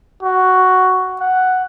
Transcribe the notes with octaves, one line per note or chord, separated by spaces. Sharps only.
F#4
F#5